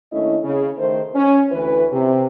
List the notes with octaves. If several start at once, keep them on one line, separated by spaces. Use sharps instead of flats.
D#2 A3 C#4 D4 E4 D#5
C#3
D#3 A3 C5
C#4
D2 E3 E4 B4
C3